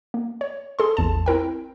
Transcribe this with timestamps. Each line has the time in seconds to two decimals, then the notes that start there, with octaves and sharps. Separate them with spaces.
0.14 A#3
0.41 C#5
0.79 G#4 A4 C6
0.97 A1 E2 A5
1.26 C4 E4 A#4 G5